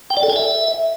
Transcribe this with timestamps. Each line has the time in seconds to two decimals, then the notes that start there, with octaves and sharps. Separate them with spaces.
0.10 G5
0.17 D5
0.23 A4
0.30 G#5
0.36 E5